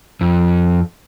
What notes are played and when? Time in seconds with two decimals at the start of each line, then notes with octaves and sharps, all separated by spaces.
0.21 F2